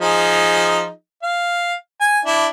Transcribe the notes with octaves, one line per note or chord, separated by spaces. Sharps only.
F3 D#4 G#4
F5
G#5
D4 E4